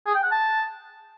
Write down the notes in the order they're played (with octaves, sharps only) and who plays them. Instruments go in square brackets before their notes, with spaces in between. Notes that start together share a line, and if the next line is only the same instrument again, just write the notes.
[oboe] G#4
G5
F#5
A5